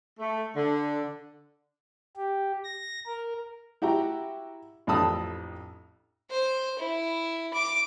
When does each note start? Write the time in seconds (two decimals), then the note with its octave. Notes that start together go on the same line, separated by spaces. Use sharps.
0.19 A3
0.56 D3
2.16 G4
2.64 A#6
3.06 A#4
3.82 E4 F#4 G4 A#5
4.87 A1 F2 D4 A5 B5 D#6
6.30 C5
6.79 E4
7.54 D6